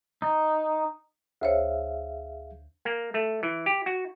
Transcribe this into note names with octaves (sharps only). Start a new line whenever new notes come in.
D#4
D2 G#4 C5 C#5 E5 F5
A#3
A3
E3
G4
F#4